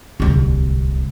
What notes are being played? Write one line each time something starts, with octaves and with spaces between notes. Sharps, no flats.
D1 C2